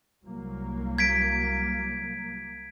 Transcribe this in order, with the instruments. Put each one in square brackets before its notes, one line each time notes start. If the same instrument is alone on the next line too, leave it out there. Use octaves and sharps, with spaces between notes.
[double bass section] C2 F#3 A#3
[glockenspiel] G#6 B6 D7